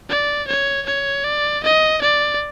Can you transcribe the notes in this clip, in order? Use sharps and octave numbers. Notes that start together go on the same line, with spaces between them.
D5
C#5
C#5
D5
D#5
D5